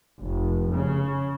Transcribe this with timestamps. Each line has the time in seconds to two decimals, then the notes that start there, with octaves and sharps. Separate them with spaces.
0.19 F1
0.71 C#3